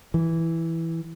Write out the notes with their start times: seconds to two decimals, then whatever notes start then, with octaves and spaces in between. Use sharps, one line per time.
0.14 E3